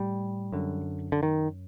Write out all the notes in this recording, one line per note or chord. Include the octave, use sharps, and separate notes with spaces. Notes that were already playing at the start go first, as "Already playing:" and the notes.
Already playing: A2 G3
F#2 D3
D3
D#3